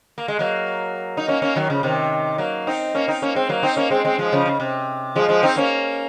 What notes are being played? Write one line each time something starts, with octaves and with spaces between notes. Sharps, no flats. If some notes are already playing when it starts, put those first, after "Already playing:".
A#3
G#3
F#3 A#3
D#4
A#3 C#4
A#3 C#4
D#3 F#3
C#3 F3
C3 D#3
F#3 A#3
C4 D#4
A#3 C#4
C4 D#4
A#3 C#4
G#3 C4
F#3 A#3
C4 D#4
A#3 C#4
G#3 C4
G#3 C4
F3 G#3
C#3 F3
C#3
C3
F3 G#3
F3 G#3
C4 D#4
A#3 C#4